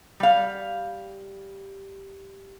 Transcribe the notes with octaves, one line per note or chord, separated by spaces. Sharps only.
G3 F5